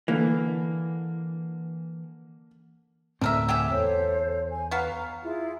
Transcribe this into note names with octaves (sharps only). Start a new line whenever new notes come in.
D3 E3 A#3
D2 A2 D3 C4 A#4 E5
G4 G#4 E5 F#5
E2 A4 C5 C#5
G#5
B3 F#4 F5 A#5
E4 F4 G#4